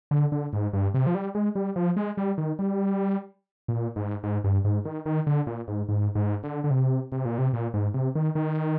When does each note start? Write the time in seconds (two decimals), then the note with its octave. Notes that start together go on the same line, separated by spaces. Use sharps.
0.11 D3
0.32 D3
0.53 G#2
0.73 G2
0.94 C3
1.07 F3
1.15 G3
1.35 G#3
1.55 G3
1.76 F3
1.96 G#3
2.17 G3
2.38 D#3
2.59 G3
3.68 A#2
3.96 G#2
4.23 G#2
4.44 G2
4.64 G#2
4.85 D#3
5.06 D#3
5.27 D3
5.47 A#2
5.68 G#2
5.89 G#2
6.15 G#2
6.43 D3
6.64 D3
6.71 C3
7.12 C3
7.25 A#2
7.38 C3
7.53 A#2
7.74 G#2
7.94 C3
8.15 D#3
8.35 D#3